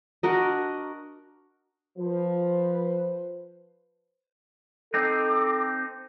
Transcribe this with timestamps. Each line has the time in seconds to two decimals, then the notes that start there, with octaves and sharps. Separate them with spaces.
0.23 D4 F#4 A#4 D#5
1.98 F3 B4 C5
4.94 C4 D#4 A4 D6